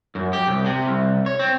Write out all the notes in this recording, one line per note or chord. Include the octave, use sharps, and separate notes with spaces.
F#2
G4
C2
C3
C2
C#5
C4